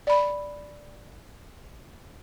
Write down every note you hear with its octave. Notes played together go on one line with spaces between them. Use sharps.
D5 B5